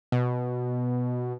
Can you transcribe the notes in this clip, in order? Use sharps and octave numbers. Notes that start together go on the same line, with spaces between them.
B2